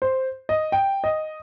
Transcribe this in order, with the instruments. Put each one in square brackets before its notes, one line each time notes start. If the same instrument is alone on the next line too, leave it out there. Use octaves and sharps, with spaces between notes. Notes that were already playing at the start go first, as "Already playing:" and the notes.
[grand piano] C5
D#5
G5
D#5